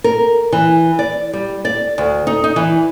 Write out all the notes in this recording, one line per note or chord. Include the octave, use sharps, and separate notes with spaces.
A#4
E3
D5
G3
D5
D2
D#4
D#4
E3